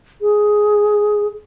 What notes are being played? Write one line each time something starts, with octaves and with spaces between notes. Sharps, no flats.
G#4